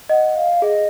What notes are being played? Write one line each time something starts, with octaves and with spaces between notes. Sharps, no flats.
D#5 F#5
F5
G#4 D#5